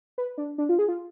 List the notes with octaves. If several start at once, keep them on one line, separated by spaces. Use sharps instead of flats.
B4
D4
D4
F4
G#4
F4